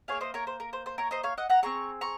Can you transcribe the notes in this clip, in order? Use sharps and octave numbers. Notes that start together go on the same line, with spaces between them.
A#3 F4 G#4 C#5 F5
C5 D#5
A#4 C#5
C5
A#4
C5
C5
A#4 C#5
C5 D#5
C#5 F5
D#5 F#5
F#5 A#5
C4 F4 G#4 A#5 C#6
A#5 C#6